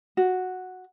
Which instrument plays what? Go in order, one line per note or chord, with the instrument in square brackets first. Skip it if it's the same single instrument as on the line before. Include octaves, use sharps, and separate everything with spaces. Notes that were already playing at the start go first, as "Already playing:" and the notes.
[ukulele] F#4